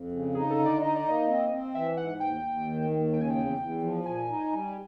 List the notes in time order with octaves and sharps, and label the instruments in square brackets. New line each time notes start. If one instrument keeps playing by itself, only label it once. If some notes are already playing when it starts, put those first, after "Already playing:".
Already playing: [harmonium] F2
C#3
[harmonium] D#4 [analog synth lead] G#4
[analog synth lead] A4
[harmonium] D3
[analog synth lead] D5
[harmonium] D#4 [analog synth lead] D#5
[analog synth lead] D5
[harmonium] A#3 [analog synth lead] D#5
[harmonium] C4
C4
[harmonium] E3 [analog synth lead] E5
[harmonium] G#2 [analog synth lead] F#5
[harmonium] D#2 [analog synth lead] G5
[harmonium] D#2
D#3
D#2
[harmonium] C#3 [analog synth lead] G5
[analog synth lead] G#5
G5
[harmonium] E2
E2
F3
[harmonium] A#2 [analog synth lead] G#5
[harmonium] D#4
G3